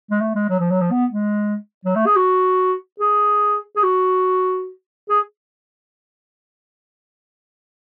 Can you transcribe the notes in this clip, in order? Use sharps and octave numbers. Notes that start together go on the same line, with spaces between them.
G#3
A3
G#3
F#3
F3
F#3
F3
B3
G#3
F#3
A3
G#4
F#4
G#4
G#4
F#4
G#4